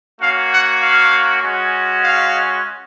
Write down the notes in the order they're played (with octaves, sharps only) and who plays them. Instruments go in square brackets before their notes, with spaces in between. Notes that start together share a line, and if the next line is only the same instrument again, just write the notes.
[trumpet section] A#3 C#4 F#4 F5
F#5
F5
G#3 C#4 F#4
F5